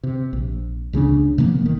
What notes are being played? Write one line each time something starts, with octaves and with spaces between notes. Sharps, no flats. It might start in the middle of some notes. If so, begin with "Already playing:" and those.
C3
A#1
C#2 C#3 A3 D4
C3 F3 A#3 B3
G1 D#3